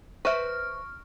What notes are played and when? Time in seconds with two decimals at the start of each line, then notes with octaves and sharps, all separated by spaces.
0.25 B4 C5 E5 C#6 F6